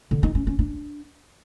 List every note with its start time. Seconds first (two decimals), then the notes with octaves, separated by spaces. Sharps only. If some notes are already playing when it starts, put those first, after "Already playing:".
0.11 D3
0.23 D#4
0.35 C#4
0.47 C#4
0.59 D4